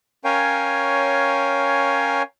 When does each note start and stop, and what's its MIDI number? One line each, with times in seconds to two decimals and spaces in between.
0.24 2.22 61
0.24 2.22 70
0.24 2.22 73
0.24 2.22 77
0.24 2.22 79
0.24 2.22 80